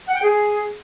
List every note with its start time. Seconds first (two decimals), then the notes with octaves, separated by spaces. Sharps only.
0.08 F#5
0.16 G5
0.24 G#4